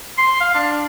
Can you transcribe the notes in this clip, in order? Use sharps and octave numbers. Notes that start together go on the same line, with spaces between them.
C6
F5
D4